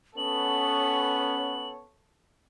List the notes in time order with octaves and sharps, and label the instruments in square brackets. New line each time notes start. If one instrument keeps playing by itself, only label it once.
[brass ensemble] B3 C#4 [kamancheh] A4 C#5 [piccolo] F#7